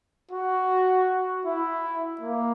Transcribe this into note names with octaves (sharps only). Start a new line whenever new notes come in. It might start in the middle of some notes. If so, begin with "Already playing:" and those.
F#4
E4
A#3